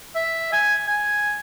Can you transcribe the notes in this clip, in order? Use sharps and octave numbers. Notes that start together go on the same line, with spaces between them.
E5
G#5
G#5